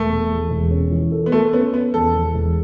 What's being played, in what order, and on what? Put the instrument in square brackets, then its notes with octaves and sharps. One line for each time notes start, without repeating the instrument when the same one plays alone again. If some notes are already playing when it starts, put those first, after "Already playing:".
Already playing: [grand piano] E1 [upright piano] A3
[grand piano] B2
E2
E1
C#4
E3
A4
[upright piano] B3
[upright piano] A3 [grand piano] A4
[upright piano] B3 [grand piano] C#4
[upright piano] B3 [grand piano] C#4
[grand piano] E2 [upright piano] A4
[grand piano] E2
E1